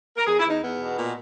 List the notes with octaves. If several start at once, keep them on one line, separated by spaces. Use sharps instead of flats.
A#4
E2 G#4
E4
E2
D#4
E2 B3
B2
A#2